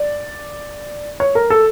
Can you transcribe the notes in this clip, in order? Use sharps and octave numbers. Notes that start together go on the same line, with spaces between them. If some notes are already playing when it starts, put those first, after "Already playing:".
Already playing: D5
C#5
A#4
A4